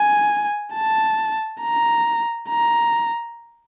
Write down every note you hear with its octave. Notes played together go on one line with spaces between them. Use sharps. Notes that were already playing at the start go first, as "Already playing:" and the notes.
Already playing: G#5
A5
A#5
A#5